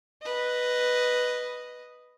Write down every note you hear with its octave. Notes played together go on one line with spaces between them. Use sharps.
B4 D#5